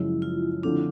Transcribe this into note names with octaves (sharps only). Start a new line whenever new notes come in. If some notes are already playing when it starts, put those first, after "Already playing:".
Already playing: F#2 C#3 F3 G#3 E4
F4
D3 F3 A3 C4 D4